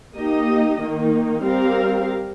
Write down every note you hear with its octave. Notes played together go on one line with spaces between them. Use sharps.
A#3 D#4 G4 D#5
D#3 A#3 D#4
G3 C4 G4 A#4 F5